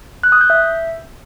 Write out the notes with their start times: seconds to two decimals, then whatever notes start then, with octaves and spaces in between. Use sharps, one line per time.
0.23 F#6
0.32 D#6
0.41 G6
0.50 E5